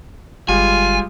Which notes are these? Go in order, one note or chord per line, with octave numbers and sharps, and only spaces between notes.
G1 G3 G#3 F4 G#5